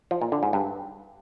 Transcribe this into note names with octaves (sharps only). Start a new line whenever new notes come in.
F3
A#2
D3
G#2
G2